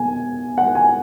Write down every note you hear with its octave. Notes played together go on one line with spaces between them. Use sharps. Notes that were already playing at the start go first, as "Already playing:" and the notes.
Already playing: B2 G#5
F#5
G#5